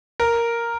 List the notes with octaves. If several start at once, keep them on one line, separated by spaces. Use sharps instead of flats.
A#4